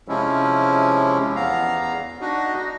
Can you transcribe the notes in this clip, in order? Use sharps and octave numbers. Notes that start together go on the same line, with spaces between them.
C3 F3 G#3 C#4 E4
E2 B3 F5 A#5
D4 D#4 F#4 D#5